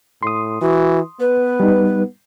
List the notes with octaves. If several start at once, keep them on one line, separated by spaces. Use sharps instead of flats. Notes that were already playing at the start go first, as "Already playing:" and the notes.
A2 C6 D#6
E3 F#4
B3 B4
G3 D#4